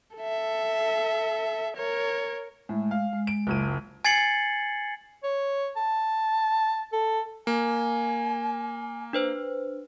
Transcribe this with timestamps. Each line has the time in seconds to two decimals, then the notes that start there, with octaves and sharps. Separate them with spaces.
0.17 A4 E5
1.77 A#4 C#5
2.69 A2 G#3
2.91 F5
3.13 G#3
3.27 D7
3.47 F#1 C#2 D#7
4.05 G#5 G#6 A6 C7 C#7 F#7
5.24 C#5
5.76 A5
6.93 A4
7.47 A#3 G#5
9.13 D4 B4 C5